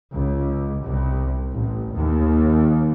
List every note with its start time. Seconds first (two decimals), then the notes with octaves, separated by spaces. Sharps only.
0.14 C#2
0.83 C2
1.53 A1
1.94 D#2